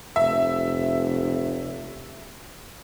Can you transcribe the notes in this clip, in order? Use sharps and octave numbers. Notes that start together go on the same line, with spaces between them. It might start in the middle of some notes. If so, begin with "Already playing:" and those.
F1 E5